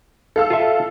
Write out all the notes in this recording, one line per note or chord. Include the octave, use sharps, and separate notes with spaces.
A4 F5 E6
F4 E5